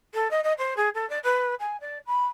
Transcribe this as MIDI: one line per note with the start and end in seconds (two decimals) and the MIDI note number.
0.14 0.30 69
0.30 0.40 75
0.43 0.52 75
0.58 0.73 72
0.76 0.88 68
0.94 1.08 69
1.09 1.18 74
1.23 1.54 71
1.59 1.76 80
1.80 1.98 74
2.06 2.25 83